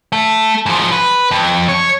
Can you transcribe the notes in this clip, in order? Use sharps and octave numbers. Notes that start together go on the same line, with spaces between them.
A3
G#2 F3
B4
F2
C#5